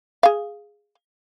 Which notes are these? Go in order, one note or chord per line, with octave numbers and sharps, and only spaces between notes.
G#4 F5